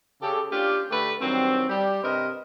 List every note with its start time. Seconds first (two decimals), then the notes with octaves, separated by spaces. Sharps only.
0.22 C#3 G4 A4
0.51 A#3 C#4 D4 F4 G4
0.91 D3 A3 G4 B4
1.21 G2 D#3 F#3 C4
1.69 G3 G4
2.03 G2 C3 C4 A#4 B4 D#5